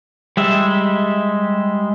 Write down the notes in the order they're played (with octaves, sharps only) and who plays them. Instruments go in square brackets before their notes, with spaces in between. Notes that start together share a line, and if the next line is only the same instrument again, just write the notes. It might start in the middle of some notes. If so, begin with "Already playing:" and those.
[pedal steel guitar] G3 G#3 E5